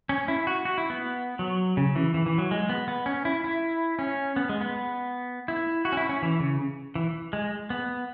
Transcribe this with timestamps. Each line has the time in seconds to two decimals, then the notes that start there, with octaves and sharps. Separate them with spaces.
0.09 C#4
0.28 E4
0.47 F#4
0.65 F#4
0.78 E4
0.90 B3
1.39 F#3
1.77 C#3
1.95 E3
2.14 E3
2.26 E3
2.38 F#3
2.51 G#3
2.69 B3
2.88 B3
3.06 C#4
3.25 E4
3.44 E4
3.99 C#4
4.36 B3
4.49 G#3
4.61 B3
5.48 E4
5.85 F#4
5.92 C#4
5.97 E4
6.09 C#4
6.22 E3
6.40 C#3
6.95 E3
7.33 G#3
7.70 B3